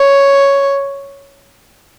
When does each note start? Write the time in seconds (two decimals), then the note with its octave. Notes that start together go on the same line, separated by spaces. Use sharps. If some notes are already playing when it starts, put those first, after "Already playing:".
Already playing: C#5